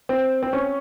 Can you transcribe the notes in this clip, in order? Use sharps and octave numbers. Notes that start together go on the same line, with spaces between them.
C4
C4
C#4